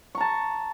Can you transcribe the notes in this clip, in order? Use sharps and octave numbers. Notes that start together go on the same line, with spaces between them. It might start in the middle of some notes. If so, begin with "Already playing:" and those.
A5 A#5 C#6